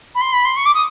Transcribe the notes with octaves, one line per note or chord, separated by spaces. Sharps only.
B5
C6
B5
C6
C#6
D6
D#6